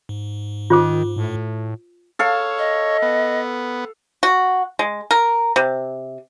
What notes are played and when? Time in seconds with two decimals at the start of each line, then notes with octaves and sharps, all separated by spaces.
0.09 G#2
0.70 D#3 F4 C5 D6
1.16 A2
2.19 A4 C#5 F5
2.58 D#5
3.02 B3
4.23 F#4
4.79 G#3
5.11 A#4
5.56 C3